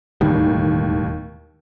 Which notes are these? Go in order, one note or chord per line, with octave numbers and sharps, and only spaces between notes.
E1 D#2 A2 G3